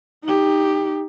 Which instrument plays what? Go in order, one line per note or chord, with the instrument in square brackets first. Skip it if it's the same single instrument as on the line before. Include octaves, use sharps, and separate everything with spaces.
[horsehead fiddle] D#4 G4